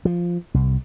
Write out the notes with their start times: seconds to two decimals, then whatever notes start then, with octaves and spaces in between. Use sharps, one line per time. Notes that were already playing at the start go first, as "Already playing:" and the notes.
0.05 F3
0.54 C2